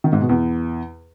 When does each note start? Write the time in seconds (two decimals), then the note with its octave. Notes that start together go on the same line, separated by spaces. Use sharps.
0.04 D#3
0.12 G#2
0.21 B2
0.29 E2